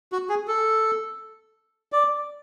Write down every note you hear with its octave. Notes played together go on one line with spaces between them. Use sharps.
F#4
G#4
A4
D5